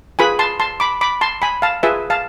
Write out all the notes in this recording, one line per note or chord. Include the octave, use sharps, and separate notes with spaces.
F4 G#4 B4 G#5 B5
A5 C6
A5 C6
B5 D6
B5 D6
A5 C6
G#5 B5
F5 A5
F4 G#4 B4 E5 G#5
F5 A5